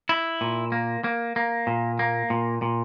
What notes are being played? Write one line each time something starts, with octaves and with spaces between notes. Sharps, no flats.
E4
A#2
A#3
A#3
A#3
A#2
A#3
A#2
A#2